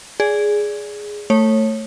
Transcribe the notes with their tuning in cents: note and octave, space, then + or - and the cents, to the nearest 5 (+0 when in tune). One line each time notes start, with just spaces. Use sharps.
G#4 +0 D5 -20
A3 +10 C#5 -20